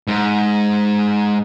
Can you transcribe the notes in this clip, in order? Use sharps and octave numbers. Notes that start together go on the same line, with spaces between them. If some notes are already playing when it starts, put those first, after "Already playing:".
G#2